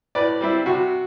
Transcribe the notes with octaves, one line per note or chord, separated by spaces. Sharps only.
A2 B4 D5
G3 C4 E4
C3 F#4